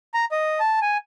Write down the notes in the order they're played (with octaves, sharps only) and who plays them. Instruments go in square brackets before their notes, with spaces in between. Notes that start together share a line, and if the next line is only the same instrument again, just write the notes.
[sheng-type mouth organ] A#5
D#5
A5
G#5